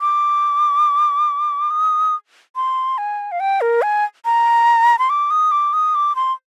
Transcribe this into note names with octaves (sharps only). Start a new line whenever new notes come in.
D6
D#6
C6
G#5
F5
G5
A#4
G#5
A#5
C6
D6
D#6
D6
D#6
D6
C6